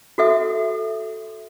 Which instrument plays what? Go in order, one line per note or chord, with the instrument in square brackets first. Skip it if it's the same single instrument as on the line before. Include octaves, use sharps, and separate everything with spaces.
[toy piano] F#4 A4 E5 D#6